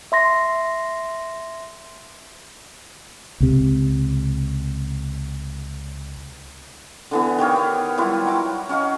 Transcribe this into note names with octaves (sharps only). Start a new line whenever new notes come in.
E5 C6 A#6
C#2 C3
D3 E3 B3
D#3 G4 C#5 F5
B3
F#3 G3 E4 F4
F#4 A#5 D6
C#4 F#4 D#5 F5